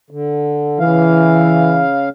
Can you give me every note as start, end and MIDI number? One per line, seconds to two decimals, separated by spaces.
0.11 0.79 50
0.80 2.09 49
0.80 1.83 52
0.80 2.09 77